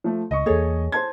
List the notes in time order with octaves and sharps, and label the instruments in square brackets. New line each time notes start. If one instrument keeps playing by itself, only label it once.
[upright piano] F3 A3
[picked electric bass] C#2 [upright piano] D#5 C#6
[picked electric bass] E2 A#3 [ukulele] G#4 A4 C#5
[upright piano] C5 A5 G#6